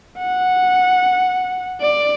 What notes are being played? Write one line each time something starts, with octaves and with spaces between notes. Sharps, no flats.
F#5
D5